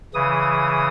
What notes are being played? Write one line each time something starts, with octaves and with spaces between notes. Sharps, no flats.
C#3 E3 D#6